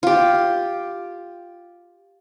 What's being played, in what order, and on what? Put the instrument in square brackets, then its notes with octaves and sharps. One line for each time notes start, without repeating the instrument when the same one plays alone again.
[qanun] F4 G4